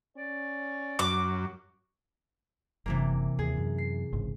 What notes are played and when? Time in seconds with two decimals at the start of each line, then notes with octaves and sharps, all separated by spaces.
0.17 C#4 D5
0.99 F#2 F#4 D6
2.86 F#1 C3 E3 A#3
3.39 D#2 G#4
3.57 F#2
3.78 C7
4.13 G1 C#2 G#2